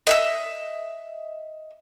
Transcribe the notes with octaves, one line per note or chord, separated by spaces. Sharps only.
D#5 E5 E6